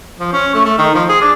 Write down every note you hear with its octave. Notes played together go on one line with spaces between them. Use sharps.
F3
C#4
A3
A3
D#3
F3
G#4
D4